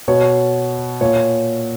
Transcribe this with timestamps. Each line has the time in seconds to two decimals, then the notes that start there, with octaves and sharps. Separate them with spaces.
0.08 B2 C#5
1.01 A#2 C#5